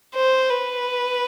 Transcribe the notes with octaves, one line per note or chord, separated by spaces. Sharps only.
C5
B4